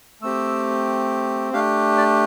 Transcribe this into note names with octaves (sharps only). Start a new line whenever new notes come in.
A3 C4 G4 E6
A3 D4 G4 F5
D5